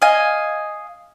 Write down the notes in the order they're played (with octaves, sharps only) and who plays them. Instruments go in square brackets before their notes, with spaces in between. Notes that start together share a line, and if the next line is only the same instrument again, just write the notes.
[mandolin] D#5 F5 G#5